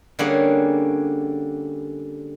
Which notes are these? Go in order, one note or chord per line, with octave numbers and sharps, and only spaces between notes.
D3 G3 A#3 C#4 G#4 F#5